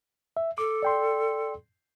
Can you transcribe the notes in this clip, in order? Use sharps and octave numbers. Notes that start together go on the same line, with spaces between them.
E5
A4 D6
D5 G5 C6